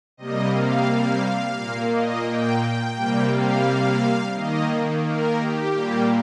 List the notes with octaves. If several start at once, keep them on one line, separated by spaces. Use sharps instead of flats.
C3 G3 A#3 D#5
F5
A#2 A#3
D#5
G5
G5
C3 G3 A#3
F5
D#3 A#3 D#5
A#4
G4
A#2 G3 A#3